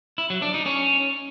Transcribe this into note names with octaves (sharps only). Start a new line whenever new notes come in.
E4
F#3
D4
D#4
C#4